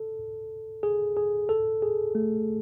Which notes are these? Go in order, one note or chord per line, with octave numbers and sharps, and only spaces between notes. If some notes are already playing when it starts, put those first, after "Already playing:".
Already playing: A4
G#4
G#4
A4
G#4
A3